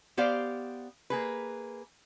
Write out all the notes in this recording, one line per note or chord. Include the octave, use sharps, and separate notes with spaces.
B3 G4 C5 D5 F5
A#3 G#4 B4